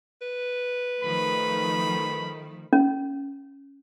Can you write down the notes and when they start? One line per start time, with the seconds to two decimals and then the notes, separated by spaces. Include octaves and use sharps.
0.21 B4
1.03 D#3 F3 A3 B5
2.73 C#4